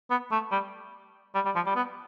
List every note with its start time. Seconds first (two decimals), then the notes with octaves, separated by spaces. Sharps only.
0.10 B3
0.32 A3
0.51 G3
1.35 G3
1.45 G3
1.55 F3
1.66 G3
1.76 B3